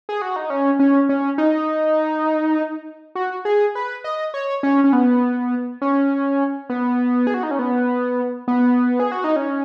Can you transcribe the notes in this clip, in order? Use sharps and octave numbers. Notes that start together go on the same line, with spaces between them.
G#4
F#4
D#4
C#4
C#4
C#4
D#4
F#4
G#4
B4
D#5
C#5
C#4
C#4
B3
C#4
B3
G#4
F#4
D#4
C#4
B3
B3
G#4
F#4
D#4
C#4